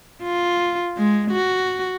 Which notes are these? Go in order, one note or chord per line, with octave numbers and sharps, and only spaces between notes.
F4
G#3
F#4